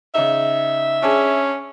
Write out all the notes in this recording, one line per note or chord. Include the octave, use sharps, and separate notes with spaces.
C#3 D#4 E5
C#4 D4 G#4